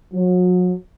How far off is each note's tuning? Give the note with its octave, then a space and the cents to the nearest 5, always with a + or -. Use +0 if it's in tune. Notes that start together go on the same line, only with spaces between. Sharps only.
F#3 -35